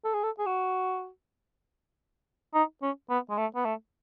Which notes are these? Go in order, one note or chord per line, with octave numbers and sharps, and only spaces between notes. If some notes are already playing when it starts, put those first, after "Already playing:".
A4
G#4
A4
G#4
F#4
D#4
C#4
B3
G#3
A3
B3
A3